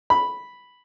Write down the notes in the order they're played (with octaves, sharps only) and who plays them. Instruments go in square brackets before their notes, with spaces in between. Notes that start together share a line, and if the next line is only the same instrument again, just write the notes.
[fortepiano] B5